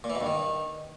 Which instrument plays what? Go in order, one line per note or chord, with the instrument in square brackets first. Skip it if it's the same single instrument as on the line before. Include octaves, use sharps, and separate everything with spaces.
[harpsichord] A#2
E3
B2
G2
D#3